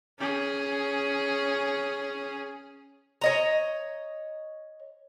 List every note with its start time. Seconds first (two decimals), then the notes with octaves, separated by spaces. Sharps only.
0.19 C#4 G#4
3.21 C#5 D#5 A#5